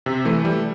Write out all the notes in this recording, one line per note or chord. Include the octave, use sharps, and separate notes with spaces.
C3
E3 A3
G3